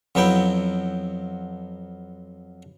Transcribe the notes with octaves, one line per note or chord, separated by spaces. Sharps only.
F2 F#3 B3 E4 G5